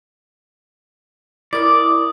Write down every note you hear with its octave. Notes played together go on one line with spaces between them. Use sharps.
E4 A#4 D5 D6 D#6